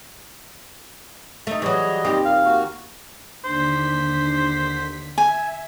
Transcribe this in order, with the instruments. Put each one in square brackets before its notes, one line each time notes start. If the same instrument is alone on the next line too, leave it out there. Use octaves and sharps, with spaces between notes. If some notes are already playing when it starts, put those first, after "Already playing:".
[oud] A3 D#4
[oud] E3 F#3 [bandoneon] G3 D#5 [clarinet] G#4
[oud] D#2 C4 G4
[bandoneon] A#2 [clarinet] F5
[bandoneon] A#3 F#4
[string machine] D#2 D3 B6 [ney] D4 [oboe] C5
[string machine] E5 [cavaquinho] G#5